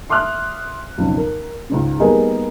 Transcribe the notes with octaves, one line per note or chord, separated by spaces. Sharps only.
E5 C6 D6 D#6 F6 F#6
B1 F2 C#3
A#4
C#2 G#2 C#3
G3 A#3 B3 D#4 G#4 A#4